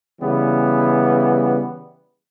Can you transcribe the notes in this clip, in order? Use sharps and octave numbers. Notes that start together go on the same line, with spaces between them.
C#3 E3 G3 B3